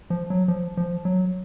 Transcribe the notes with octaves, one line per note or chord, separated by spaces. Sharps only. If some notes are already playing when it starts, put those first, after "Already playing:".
F3
F#3
F3
F3
F#3